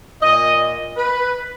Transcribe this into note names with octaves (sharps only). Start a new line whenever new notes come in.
A#2 D#5
B4